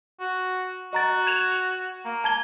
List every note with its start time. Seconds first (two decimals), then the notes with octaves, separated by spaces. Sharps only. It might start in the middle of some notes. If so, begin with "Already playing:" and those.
0.21 F#4
0.93 F#4 D#5 A#5 A6
1.27 G#6 E7 F7
2.05 A#3
2.24 A5 G#6 G7